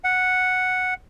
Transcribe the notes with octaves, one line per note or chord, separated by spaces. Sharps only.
F#5